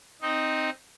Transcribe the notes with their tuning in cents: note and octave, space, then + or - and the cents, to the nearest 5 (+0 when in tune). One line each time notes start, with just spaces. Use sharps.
C4 +0 D#4 +0 D#5 +0